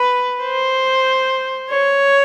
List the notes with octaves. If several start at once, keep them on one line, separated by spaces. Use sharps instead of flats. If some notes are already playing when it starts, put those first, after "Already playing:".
Already playing: B4
C5
C#5